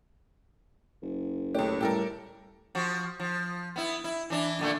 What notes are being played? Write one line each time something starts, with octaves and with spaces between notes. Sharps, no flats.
F#1
C#2 A3 G4 C#5
A2 G3 G4 A4 A#4
F3 F#4
F3
B3 E4
E4
E3 D4 E4
A#2 D3 A3